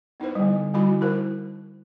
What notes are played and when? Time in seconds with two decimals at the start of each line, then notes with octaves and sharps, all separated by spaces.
0.20 B3 D#4 E4 B4 C5
0.35 D3 G3
0.74 D3 G3 D#4 E4 F#4 B5
1.01 E4 A#4 C5